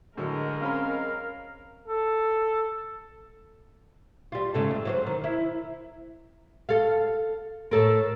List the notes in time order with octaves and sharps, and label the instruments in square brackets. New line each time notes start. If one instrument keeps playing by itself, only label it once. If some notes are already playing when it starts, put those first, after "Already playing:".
[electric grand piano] A2 D3 F#3 [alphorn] G#3 [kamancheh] A#4
[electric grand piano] C4 C#4 B5 [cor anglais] F5
[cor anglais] A4
[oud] G3 F4
G#2 C#3 A3
F2
F#3 F#4 C5
D#3
E4
A4 F5
A2 A4 A#4